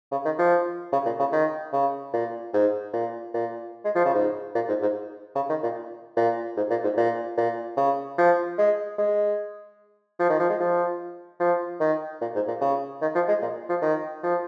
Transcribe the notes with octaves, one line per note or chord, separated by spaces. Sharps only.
C#3
D#3
F3
C#3
A#2
C#3
D#3
C#3
A#2
G#2
A#2
A#2
G#3
F3
C#3
G#2
A#2
G#2
G#2
C#3
D#3
A#2
A#2
G#2
A#2
G#2
A#2
A#2
C#3
F3
G#3
G#3
F3
D#3
F3
G#3
F3
F3
D#3
A#2
G#2
A#2
C#3
D#3
F3
G#3
A#2
F3
D#3
F3